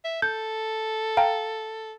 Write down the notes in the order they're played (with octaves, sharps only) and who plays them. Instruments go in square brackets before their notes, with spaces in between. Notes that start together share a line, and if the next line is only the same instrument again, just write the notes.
[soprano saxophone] E5
[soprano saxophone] A4 [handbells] G6
[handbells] F5 G5 A#5